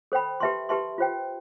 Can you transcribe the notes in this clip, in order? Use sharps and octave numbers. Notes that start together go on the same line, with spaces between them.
A4 C5 G5 B5
G4 B4 E5 A5 C6
G4 B4 E5 A5 C6
F4 C5 G5